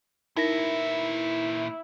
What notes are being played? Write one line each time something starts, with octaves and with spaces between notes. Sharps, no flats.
A#2 D#4 E4 A#4 E5 A#6